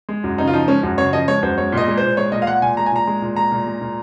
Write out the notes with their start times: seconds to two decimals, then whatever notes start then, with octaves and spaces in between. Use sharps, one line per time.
0.09 G#3
0.24 F#2
0.38 C#3 D#4
0.47 F4
0.53 F3 D#4
0.68 G#3 C#4
0.83 F#2
0.98 C#3 C#5
1.13 F3 D#5
1.28 G#3 C#5
1.42 F#2 C5
1.58 G#3 C#5
1.72 A#2
1.78 D#5
1.88 G#3
1.98 C5
2.03 A#2
2.17 G#3 C#5
2.32 A#2 D#5
2.42 F5
2.47 G#3 F#5
2.62 A#2 G#5
2.77 G#3 A#5
2.86 G#5
2.92 A#2 A#5
3.07 G#3
3.22 A#2
3.36 G#3 A#5
3.52 A#2
3.66 G#3
3.81 A#2